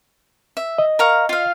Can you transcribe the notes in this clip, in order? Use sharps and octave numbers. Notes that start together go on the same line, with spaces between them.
E5
D#5
A#4 F5 C#6
F4 F5